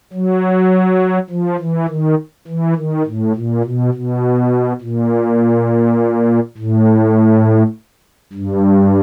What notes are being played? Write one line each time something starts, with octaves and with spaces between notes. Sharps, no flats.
F#3
F3
E3
D#3
E3
D#3
A2
A#2
B2
B2
A#2
A2
G2